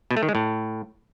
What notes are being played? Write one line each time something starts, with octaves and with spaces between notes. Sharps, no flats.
B2
A3
D#3
G#3
A2